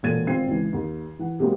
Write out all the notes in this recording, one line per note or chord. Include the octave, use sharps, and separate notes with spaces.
E1 A#2 A4 G#6 A6 D#7
G#1 C4 F4 G5 G#6 C7
C#2 G#2 E3
D#2
E3 F#5
C3 F#3 G#3 A#3 C4